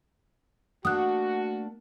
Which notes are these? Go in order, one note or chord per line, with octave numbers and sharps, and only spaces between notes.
A3 A#3 D4 F#4 F#5 D#6 F#6